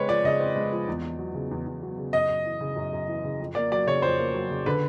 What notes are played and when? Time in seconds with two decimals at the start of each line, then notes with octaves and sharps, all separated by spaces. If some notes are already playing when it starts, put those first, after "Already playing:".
Already playing: C#3 G#3 C4 B4 C#5
0.09 F3 D5
0.24 C#3 D#5
0.40 C4
0.56 G#3
0.72 F3
0.88 E2
1.04 E2
1.19 F#3
1.34 C#3
1.51 E2
1.67 E2
1.83 F#3
1.98 C#3
2.13 F#2 D#5
2.29 F#2
2.45 E3
2.60 C#3
2.76 F#2
2.93 F#2
3.08 E3
3.24 C#3
3.40 F2
3.55 A#3 D5
3.72 F#3 D5
3.87 C#3 C#5
4.02 F2 C5
4.19 A#3
4.34 F#3
4.50 C#3
4.66 D3 B4